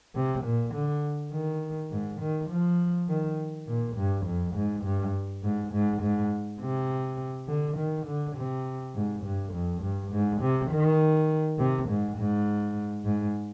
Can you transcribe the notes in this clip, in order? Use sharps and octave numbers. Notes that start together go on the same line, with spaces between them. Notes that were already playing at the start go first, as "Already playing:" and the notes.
C3
A#2
D3
D#3
G#2
D#3
F3
D#3
A#2
G2
F2
G#2
G2
G#2
G#2
G#2
C3
D3
D#3
D3
C3
G#2
G2
F2
G2
G#2
C3
D#3
C3
G#2
G#2
G#2